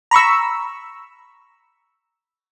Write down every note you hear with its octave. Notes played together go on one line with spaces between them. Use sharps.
A#5 B5 C#6 E6